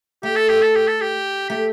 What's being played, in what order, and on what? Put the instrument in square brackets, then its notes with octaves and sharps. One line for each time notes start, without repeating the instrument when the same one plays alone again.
[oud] A3 [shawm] G4
[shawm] A4
G4
A4
G4
A4
G4
[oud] A3 [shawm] G4